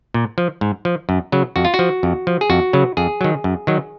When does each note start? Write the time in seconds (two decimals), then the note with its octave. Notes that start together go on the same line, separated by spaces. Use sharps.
0.14 A#2
0.38 F3
0.61 G#2
0.85 F3
1.09 F#2
1.32 C#3 F#3
1.56 F2 F#4
1.65 F4
1.74 F#4
1.79 F3
2.03 F2
2.27 F3
2.41 G#4
2.50 F2 F#4
2.73 C#3 F#3
2.97 F2 G#4
3.21 D#3 F#3
3.44 F#2
3.67 D#3 F#3